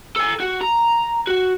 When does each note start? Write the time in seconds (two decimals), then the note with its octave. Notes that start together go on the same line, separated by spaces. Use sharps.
0.16 A4 G#5
0.40 F#4
0.61 A#5
1.27 F#4